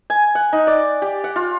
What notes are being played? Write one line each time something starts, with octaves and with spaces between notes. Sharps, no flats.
G#5
F#5
D#4
D5
G4
F#5
F4